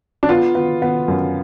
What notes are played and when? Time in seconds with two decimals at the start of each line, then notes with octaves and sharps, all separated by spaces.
0.23 D4
0.29 B3 F4
0.55 B3
0.82 B3
1.08 F#2